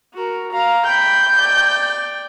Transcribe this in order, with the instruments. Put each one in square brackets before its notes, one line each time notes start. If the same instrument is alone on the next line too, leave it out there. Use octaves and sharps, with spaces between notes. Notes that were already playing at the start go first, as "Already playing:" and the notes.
[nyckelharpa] F#4 A#4
F5 A#5
[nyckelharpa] G5 B5 [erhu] G6
[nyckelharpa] D5 G5